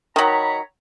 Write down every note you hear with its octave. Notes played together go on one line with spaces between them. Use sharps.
D#3 F#3 C#5 A#5 B5